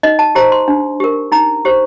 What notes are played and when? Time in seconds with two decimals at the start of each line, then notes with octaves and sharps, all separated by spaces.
0.03 D#4 D#5
0.19 A5
0.35 G4 C5 A#5
0.52 C6
0.68 D4
1.00 G4 A#4
1.32 D#4 A#5
1.65 G4 C5